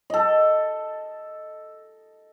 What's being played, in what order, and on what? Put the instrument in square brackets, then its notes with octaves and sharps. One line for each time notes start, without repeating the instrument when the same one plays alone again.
[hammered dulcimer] A4 D#5